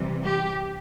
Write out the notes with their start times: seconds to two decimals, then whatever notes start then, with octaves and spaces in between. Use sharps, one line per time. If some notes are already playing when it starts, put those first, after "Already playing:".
Already playing: C3 E3 G3
0.23 G4